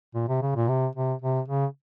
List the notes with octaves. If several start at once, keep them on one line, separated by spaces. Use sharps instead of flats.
A#2
C3
C#3
A#2
C3
C3
C3
C#3